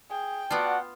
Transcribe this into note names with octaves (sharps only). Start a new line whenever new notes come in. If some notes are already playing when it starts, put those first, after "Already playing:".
G#4 G5
B3 F4 F#4 D5 F#5 A5